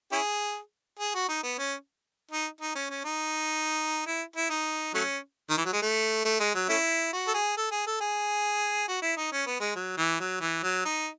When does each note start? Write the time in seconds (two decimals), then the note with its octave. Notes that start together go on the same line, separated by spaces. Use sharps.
0.12 C#4 E4 G#4
0.99 G#4
1.15 F#4
1.28 D#4
1.43 B3
1.58 C#4
2.31 D#4
2.61 D#4
2.75 C#4
2.90 C#4
3.04 D#4
4.06 E4
4.36 E4
4.50 D#4
4.94 F#3 A3 C#4
5.50 D#3
5.57 E3
5.65 F#3
5.73 G#3
5.82 A3
6.25 A3
6.40 G#3
6.55 F#3
6.69 A3 C#4 E4
7.13 F#4
7.27 A4
7.34 G#4
7.57 A4
7.71 G#4
7.86 A4
8.00 G#4
8.88 F#4
9.02 E4
9.17 D#4
9.32 C#4
9.47 B3
9.60 G#3
9.75 F#3
9.97 E3
10.20 F#3
10.41 E3
10.63 F#3
10.85 D#4